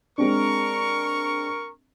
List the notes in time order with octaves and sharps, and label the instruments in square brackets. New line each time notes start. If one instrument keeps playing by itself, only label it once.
[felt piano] G#3 C4 D4 [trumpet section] A#4 C#6